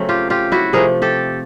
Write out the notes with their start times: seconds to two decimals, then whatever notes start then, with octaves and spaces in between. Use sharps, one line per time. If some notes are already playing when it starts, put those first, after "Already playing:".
Already playing: C#3 F#3 A3 C4
0.09 F4 G4
0.30 F4 G4
0.52 E4 F#4
0.73 C3 F3 A3 G#4 A#4
1.02 G4 A4